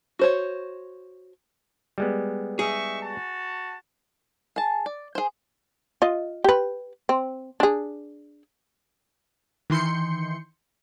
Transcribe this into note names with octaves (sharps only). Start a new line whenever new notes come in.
F#4 C5 C#5
G3 G#3 B3
D#4 G#4 E5 C#6
F#4 A5
G#4 A5
D5
G#4 C5
F4 D#5
G4 B4
C4
D4 G#4
D#3 E3 C6 G6 C#7